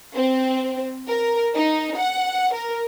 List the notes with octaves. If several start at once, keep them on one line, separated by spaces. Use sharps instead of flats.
C4
A#4
D#4
F#5
A#4